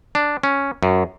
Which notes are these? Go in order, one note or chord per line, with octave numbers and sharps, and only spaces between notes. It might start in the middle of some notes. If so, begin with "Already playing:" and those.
D4
C#4
F#2